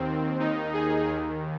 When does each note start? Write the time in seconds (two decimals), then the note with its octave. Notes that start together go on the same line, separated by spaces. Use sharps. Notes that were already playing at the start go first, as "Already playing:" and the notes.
Already playing: D#2 D#3 C4
0.40 D#2 D#3 D#4
0.74 G#4
1.07 D#2 D#3